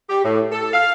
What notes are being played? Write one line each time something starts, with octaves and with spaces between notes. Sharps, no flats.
G4
A2
A4
F5